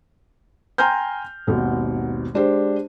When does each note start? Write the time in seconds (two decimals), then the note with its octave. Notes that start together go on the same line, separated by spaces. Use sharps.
0.78 G5 G#5 A#5 C6 F6 G6
1.47 G#1 D#2 B2
2.34 G#3 D4 G4 C5